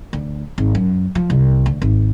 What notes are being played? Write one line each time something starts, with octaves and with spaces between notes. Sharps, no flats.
D2
G#1
F#2
F3
C2
D2
G#1